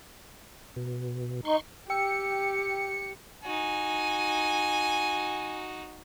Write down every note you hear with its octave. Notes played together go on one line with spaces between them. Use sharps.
B2
D#4 C6 C#6
G4 G5 E6 C#7
D#4 F#4 G#5